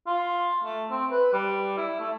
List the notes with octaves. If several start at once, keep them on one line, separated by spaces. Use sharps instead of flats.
F4
A3
C4
B4
G3
E4
A3